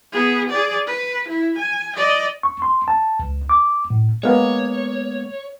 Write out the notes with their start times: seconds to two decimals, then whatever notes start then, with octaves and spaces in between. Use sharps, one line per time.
0.12 B3 G#4
0.50 G#4 D5
0.87 B4
1.28 E4
1.58 G#5
1.97 D5 D#5
2.43 C#6
2.62 C6
2.88 A5
3.19 C#2
3.49 D6
3.90 A2
4.23 G#3 A#3 B3 C#5